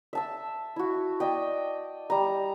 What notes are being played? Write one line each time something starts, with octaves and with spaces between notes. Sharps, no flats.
E5 A5 E6
E4 F#4
D5 D#5 G5
G3 A#5